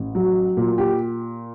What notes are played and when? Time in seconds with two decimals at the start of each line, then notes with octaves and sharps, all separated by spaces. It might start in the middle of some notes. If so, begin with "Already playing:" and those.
Already playing: A1
0.15 F#3
0.57 A#2
0.78 G4